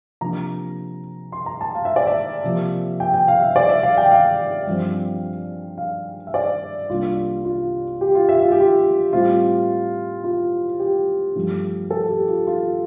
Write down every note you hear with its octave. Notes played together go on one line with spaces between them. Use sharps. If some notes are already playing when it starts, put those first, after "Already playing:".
C3 F3 A#3 D4 A#5
C6
A#5
A5
F5
E5
D5
E5
C3 F3 A#3
G5
G5
F5
E5
D5
E5
F5
G5
F5
G2 F3 C4
F5
E5
D5
C2 C3 G3 A#3 D4 F4
F4
G4
F4
E5
F4
G4
F4
A2 G3 C4 F4
F4
G4
G2 F3 A3 D4
A4
G4
F4
F4